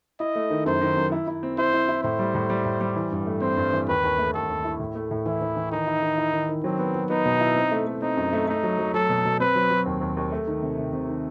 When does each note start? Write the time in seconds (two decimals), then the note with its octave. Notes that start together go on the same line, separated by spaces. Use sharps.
0.20 E4 D#5
0.35 A3
0.51 D#3
0.66 F#2 C5
0.81 D#3
0.97 F#2
1.12 E4
1.28 E4
1.43 C4
1.58 E4 C5
1.74 E4
1.89 E4
2.03 A2 C5
2.19 G3
2.35 A2
2.50 G3
2.65 A2
2.81 G3
2.96 E3
3.11 G2
3.26 A3
3.41 C4 C5
3.57 G2
3.73 E3
3.88 D#2 B4
4.04 D#2
4.18 A3
4.34 D#2 A4
4.49 D#2
4.65 E4
4.80 A2
4.95 A3
5.11 A2
5.26 E3 E4
5.41 E3
5.57 E3
5.72 D#3 D#4
5.87 E4
6.03 D#3
6.18 E4
6.33 D#3
6.49 D#3
6.63 F#3 C4
6.79 B3
6.95 F#3
7.10 B3 D#4
7.25 B2
7.41 E4
7.56 C4
7.71 A3
7.87 A3
8.02 C4 D#4
8.17 F#2
8.33 A3
8.47 A3 D#4
8.63 F#3
8.79 F#3
8.94 F#3 A4
9.09 B2
9.25 B2
9.40 C4 B4
9.55 F#3
9.70 F#3
9.86 D#2
10.01 D#2
10.17 D#2
10.32 A3
10.47 D#3
10.63 C3
10.77 C3
10.93 C3
11.09 D#3